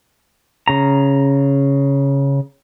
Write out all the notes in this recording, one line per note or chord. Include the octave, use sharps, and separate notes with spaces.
C#3 A#5